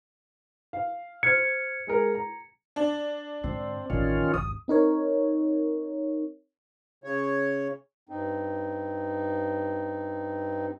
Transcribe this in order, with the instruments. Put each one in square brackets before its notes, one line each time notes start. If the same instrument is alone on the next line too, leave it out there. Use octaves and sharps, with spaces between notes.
[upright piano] F5
[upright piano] C5 F6 G#6 [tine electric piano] C#7
[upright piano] G#3 G#4 A#4
A#5
[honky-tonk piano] D4
[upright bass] G#2 D3 [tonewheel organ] C4
[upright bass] A1 E2 [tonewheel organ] D#3 C#4 F4
[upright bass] G#1 D#2 [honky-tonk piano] D#6
[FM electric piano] C4 D#4 A#4 C#5
[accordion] C#3 C#5
[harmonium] G2 C4 D#4